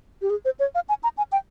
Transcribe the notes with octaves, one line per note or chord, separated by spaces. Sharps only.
G4
G#4
C5
C#5
F5
G#5
A#5
G#5
G5